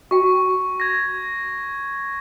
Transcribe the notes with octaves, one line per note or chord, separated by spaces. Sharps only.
F#4 G5 C#6
G#6 A#6